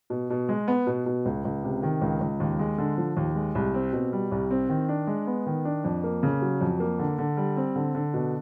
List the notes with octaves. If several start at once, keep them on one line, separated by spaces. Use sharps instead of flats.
B2
B2
G#3
B3
B2
B2
C#2
C#2
C3
D#3
C#2
C#2
D#2
G#3
D3
F3
D#2
G#3
C2
C4
B2
G3
C2
C4
D#3
D4
G#3
B3
D#3
D4
F2
A#3
C#3
F#3
F2
A#3
D3
D3
G3
C4
D3
D3
B2